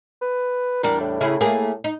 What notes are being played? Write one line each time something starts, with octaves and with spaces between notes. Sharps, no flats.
B4
E2 G3 D4 A#4
A2
C#3 E4 G#4
A3 A#3 G#4
D#4